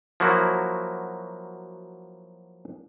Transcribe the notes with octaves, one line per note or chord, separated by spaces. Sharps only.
F3 F#3 A#3 E4 F#4